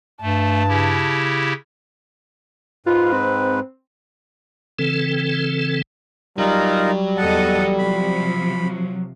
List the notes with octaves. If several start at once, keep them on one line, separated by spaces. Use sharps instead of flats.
G2 A3 A5
C#3 E4 G4
G#2 G#3 F4 B4
C4
C#3 E3 C4 A4
F#3 G3 D#4 F4 A#4
E2 A4 D#5 F#5 A5
C3 F3 B5